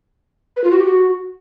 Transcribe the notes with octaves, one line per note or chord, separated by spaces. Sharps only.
B4
F4
F#4
G4
F#4